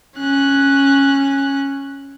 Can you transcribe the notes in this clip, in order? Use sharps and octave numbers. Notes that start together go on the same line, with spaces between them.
C#4 F#6